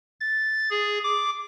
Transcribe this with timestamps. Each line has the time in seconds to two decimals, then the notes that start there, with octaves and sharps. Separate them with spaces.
0.20 A6
0.70 G#4
1.04 D6